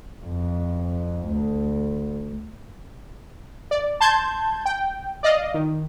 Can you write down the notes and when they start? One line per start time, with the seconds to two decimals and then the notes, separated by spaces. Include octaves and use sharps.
0.24 F2
1.27 D2
3.71 D5
4.01 A5 C6 G6 G#6
4.66 G5
5.23 D5 D#5 F5
5.54 D#3